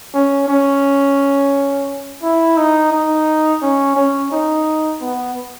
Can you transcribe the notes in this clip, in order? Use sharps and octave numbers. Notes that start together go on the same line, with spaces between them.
C#4
C#4
E4
D#4
D#4
C#4
C#4
D#4
B3